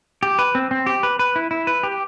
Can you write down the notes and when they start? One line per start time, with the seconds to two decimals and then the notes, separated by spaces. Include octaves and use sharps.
0.23 G4
0.39 B4
0.55 C4
0.71 C4
0.86 G4
1.03 B4
1.19 B4
1.36 E4
1.51 E4
1.67 B4
1.83 G4